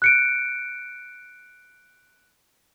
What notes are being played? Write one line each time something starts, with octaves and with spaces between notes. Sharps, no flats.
F#6 C#7 D7